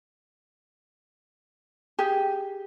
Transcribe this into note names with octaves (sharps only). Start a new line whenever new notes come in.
G4 G#4